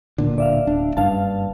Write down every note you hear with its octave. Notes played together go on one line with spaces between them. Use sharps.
D1 A#2 D3
D5 E5 F5
D1 D4
F#1 G2 F5 A5